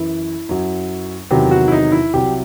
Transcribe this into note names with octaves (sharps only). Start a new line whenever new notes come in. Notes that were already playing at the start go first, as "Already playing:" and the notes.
Already playing: F#2 E3 E4
F#2 F#3
E2 C3 D#3 F#3 G4
F#4
E4
D#4
E4
C2 C3 F#3 G4